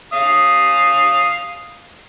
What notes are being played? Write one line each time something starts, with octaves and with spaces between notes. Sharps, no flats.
F5 D#6